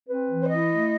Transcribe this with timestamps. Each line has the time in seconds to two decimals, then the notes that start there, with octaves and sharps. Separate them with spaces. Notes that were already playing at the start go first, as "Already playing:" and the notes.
0.09 C4 B4
0.29 E3
0.42 C5
0.49 E4 D#5
0.70 A3